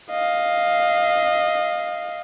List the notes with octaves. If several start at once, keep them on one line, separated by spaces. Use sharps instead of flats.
D#5 F5